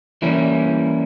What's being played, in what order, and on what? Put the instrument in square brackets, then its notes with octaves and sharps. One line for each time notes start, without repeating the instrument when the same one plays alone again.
[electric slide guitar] E3 G3 A#3 C#4 E4